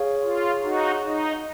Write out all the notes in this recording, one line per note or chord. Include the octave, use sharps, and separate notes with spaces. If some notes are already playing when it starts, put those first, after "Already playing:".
Already playing: G#4 C#5 F5
F4
D#4 F#4
D#4